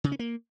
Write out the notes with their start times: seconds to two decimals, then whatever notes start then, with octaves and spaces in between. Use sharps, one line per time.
0.04 C#3
0.12 C#4
0.19 A#3